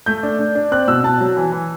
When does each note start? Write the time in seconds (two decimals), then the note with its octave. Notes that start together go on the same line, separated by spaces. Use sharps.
0.06 A3 G6
0.23 D4
0.39 D4
0.55 D4
0.72 C4 F#6
0.88 B2 E6
1.04 B2 A5
1.20 F#3
1.37 E3
1.52 E3